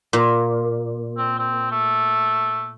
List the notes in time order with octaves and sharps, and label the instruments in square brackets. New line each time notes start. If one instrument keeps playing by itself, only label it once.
[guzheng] A#2
[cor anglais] C4
C4
A3